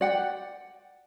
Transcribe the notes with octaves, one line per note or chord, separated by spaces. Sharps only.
D5 F#5 G5